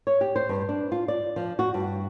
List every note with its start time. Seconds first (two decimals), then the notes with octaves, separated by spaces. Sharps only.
0.07 C#5
0.21 G4
0.36 C5
0.49 G2
0.69 D4
0.92 F4
1.08 D5
1.36 F3
1.59 F#4
1.74 G2